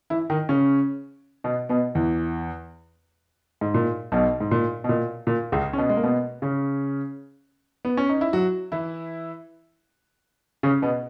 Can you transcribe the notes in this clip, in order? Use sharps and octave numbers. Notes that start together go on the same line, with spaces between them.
E3 E4
D#3 D#4
C#3 C#4
B2 B3
B2 B3
E2 E3
G#2
A#2
B1 B2
G#2
A#2
B2
A#2
A#2
C#2 C#3
C#4
B2 B3
G#3
A#3
B2 B3
C#3 C#4
B3
C#4
D#4
E4
F#3 F#4
E3 E4
C#3 C#4
B2 B3